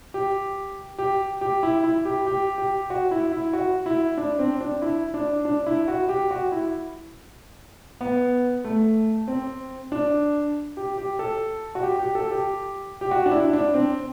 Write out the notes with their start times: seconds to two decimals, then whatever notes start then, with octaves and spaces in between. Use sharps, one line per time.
0.14 G4
0.99 G4
1.41 G4
1.63 E4
1.84 E4
2.05 G4
2.27 G4
2.58 G4
2.90 F#4
3.11 E4
3.33 E4
3.53 F#4
3.86 E4
4.18 D4
4.39 C4
4.61 D4
4.82 E4
5.14 D4
5.45 D4
5.66 E4
5.88 F#4
6.09 G4
6.31 F#4
6.52 E4
8.01 B3
8.64 A3
9.28 C4
9.92 D4
10.77 G4
10.98 G4
11.19 A4
11.75 F#4
11.83 G4
11.99 G4
12.15 A4
12.31 G4
13.01 G4
13.11 F#4
13.26 D4
13.32 E4
13.53 D4
13.74 C4